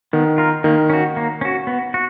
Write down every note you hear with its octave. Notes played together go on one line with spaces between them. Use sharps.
D#3 B3
F4 A#4
D#3 A#3
C#4 F#4
A#3
C#4 F#4
B3
F#4